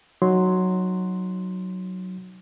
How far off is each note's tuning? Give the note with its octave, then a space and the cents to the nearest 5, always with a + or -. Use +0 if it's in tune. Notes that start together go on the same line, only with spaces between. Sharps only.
F#3 +0 D#4 -10 C6 +0